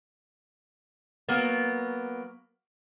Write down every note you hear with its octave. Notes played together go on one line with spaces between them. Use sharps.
F#3 A#3 B3